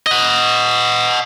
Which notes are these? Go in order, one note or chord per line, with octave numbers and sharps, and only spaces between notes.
D#5 F#5